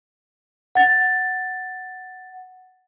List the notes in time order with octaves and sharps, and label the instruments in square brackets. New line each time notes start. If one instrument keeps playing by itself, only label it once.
[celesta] F#5 A6